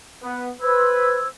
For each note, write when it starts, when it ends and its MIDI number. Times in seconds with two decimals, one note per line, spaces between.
0.23 0.49 59
0.61 1.19 71
0.61 1.25 72
0.61 1.25 88
0.61 1.25 92